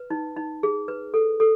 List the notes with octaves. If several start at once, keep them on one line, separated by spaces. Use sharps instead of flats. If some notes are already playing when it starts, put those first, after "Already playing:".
Already playing: B4
D#4
D#4
G#4
B4
A4
A4